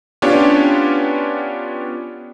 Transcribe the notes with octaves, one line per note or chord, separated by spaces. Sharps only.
B3 C#4 D4 F4 G4 C#5